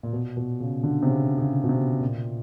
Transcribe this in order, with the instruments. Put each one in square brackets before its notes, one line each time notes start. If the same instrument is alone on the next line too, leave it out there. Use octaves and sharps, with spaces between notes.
[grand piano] A#2
B2
B2
C#3
D3
C3
C#3
C#3
B2
C3
A#2